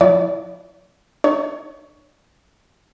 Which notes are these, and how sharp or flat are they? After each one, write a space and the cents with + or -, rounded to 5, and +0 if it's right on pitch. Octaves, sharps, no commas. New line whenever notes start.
F3 +30 E4 +0 C#5 +45
D4 +35 C#5 +10